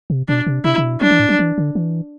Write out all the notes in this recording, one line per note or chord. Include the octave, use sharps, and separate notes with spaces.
C3
B2 D4
C3
C3 E4
C3
B2
F#3 D4
E3
A2
F#3
E3
D3
E3